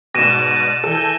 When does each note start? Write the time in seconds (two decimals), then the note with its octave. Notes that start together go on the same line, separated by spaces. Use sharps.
0.15 G#2 B2 D5 A#6 D#7 E7
0.84 E3 A4 G#5 G6